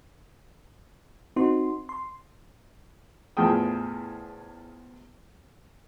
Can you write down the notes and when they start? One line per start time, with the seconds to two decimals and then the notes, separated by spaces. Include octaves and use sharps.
1.36 C4 D#4 F#4 C6
1.89 C6
3.37 E2 A2 F3 G#4 G5 D#6